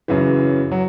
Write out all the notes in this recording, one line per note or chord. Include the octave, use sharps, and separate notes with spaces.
F#2 C#3 E3
F#3